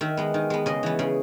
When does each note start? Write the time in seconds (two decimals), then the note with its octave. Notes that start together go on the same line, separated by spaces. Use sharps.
0.01 D#3 E5
0.17 G#3 B3
0.34 D#3
0.50 G#3 B3
0.66 C#3 D#5
0.83 E3 B3
0.99 C#3